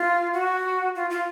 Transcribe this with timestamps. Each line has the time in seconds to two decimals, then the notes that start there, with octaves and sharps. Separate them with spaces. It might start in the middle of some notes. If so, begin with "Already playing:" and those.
Already playing: F4
0.34 F#4
0.96 F4
1.10 F4